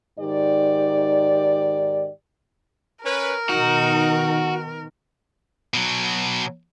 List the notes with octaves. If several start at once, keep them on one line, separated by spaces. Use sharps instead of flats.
G#2 D#3 G4 D5
C#4 A#4 B4
B2 D#3 D#4 F#4
B2 F#3